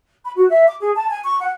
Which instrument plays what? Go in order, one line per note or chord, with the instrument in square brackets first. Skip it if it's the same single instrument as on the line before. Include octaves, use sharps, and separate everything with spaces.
[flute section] B5
F#4
E5
D6
G#4
A5
G#5
C#6
F#5